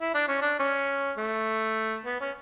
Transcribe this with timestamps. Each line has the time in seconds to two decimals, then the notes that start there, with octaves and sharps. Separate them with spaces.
0.01 E4
0.14 D4
0.28 C#4
0.42 D4
0.59 C#4
1.18 A3
2.05 B3
2.20 C#4